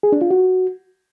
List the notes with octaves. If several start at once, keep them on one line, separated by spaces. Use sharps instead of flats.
G#4
D4
F4
F#4